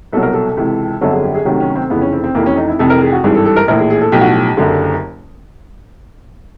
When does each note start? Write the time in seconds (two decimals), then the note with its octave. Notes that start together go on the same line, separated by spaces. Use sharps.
0.13 C2 B2 F#3 A4
0.22 A#4
0.33 A4
0.57 C#2 C3 E3
1.01 G1 F2 D3 F#3 A4
1.13 G#4
1.23 G4
1.35 G#4
1.45 D2 C3 D#3 F#3 G4
1.60 C#4
1.75 C4
1.90 F1 F2 C#3 E3 B3
2.01 C#4
2.12 C4
2.24 C4
2.34 F1 F2 C3 E3 A#3
2.46 C#4
2.57 D#4
2.68 E4
2.79 F1 F2 C3 E3 A4
2.90 A#4
3.01 G#4
3.12 F#4
3.23 G#1 G2 E3 G#4
3.35 A4
3.45 A4
3.56 A#4
3.68 A#1 A2 E3 A#4
3.79 G#4
3.90 G#4
4.01 A4
4.12 B1 A2 F3 G4
4.21 F#4
4.30 G4
4.57 F#1 F#2 D3